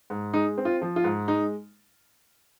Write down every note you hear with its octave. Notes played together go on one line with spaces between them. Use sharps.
G#2
G#3 D#4
C4
F4
F3
F4
G#2
G#3 D#4